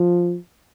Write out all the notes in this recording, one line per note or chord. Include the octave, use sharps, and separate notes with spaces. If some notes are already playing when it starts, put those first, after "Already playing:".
Already playing: F3